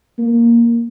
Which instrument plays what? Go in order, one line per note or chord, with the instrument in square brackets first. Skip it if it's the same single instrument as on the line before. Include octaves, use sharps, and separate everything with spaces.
[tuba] A#3